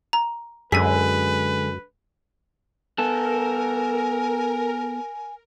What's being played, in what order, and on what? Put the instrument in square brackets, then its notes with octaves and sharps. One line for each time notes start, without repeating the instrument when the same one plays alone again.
[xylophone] A#5
[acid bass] F#2 [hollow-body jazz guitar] D3 G#3 G#4 [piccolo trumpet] B4 [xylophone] G#5 E6 B6
[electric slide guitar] B3 A4 [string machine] A#4 [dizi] G#5